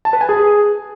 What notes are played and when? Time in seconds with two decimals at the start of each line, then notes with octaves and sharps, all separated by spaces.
0.05 A5
0.13 B4
0.21 G#5
0.29 G#4